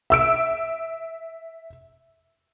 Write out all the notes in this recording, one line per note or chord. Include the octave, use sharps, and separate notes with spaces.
E5 E6 D7